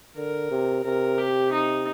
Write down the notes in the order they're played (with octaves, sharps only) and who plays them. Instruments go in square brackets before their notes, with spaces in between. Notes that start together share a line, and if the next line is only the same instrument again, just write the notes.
[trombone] D3 [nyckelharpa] A#4
[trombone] C3
[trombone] C3 [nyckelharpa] A#4
[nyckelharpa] G4
D#4